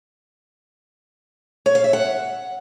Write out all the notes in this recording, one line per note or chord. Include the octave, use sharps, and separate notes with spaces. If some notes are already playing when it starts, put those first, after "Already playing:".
C#5
F5
E5
F#5